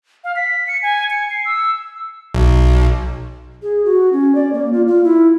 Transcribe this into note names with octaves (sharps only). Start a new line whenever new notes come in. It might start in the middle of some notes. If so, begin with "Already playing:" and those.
F5
B6
C#7
G#5
C#7
C7
E6
B1
G#4
F#4
C#4
D5
A#3
F4
F4
E4